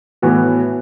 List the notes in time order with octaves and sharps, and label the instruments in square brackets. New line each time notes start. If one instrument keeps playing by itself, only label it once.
[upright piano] A2 E3 B3 F#4